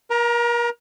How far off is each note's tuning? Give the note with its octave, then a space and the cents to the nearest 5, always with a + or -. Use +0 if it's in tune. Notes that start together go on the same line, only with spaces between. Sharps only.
A#4 +35 A#5 -5